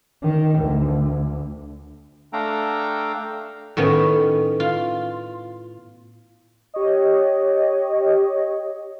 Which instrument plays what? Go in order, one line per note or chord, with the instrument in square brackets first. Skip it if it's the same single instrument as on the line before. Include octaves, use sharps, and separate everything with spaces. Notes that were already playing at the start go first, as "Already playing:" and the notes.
[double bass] D#3
D2
[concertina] A3 D4 A4 F5 G5 A#5
[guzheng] A2 D#3 B3 C#4
F4
[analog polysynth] G4 C#5 D#5